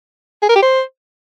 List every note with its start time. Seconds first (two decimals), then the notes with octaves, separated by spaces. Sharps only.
0.43 G#4
0.49 A#4
0.56 G4
0.62 C5